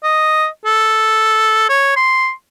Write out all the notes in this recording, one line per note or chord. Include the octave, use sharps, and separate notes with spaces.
D#5
A4
C#5
C6